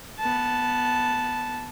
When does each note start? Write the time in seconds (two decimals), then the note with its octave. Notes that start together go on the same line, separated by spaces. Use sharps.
0.19 B3 A5